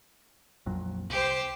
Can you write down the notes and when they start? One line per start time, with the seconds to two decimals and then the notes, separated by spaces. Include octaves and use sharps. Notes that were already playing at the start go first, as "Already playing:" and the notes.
0.66 A#1 F2 F#3
1.09 C2 G4 C5